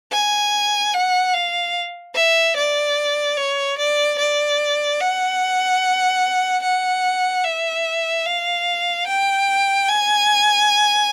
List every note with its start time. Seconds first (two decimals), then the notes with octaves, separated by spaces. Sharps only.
0.12 G#5
0.94 F#5
1.34 F5
2.15 E5
2.57 D5
3.37 C#5
3.78 D5
4.19 D5
5.01 F#5
6.63 F#5
7.44 E5
8.25 F5
9.07 G5
9.88 G#5